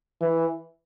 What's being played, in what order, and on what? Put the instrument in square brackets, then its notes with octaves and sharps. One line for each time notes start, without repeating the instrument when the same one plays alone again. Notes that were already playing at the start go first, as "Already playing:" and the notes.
[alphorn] E3